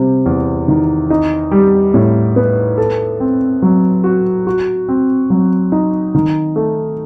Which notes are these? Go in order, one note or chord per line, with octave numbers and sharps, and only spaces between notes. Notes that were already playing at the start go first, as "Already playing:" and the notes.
Already playing: C3 G3
E2
D#3
D#4
G3
A2
B3
A4
C4
F#3
F#4
F#4
C4
F#3
D#4
D#3
A3